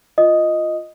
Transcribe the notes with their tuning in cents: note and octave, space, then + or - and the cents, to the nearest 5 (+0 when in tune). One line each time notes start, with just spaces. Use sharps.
F4 +0 D#5 +0 D#6 +0